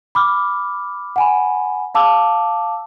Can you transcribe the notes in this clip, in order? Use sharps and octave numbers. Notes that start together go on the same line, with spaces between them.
B5 D6 F6
F#5 G#5 B5
F5 A5 D6 E6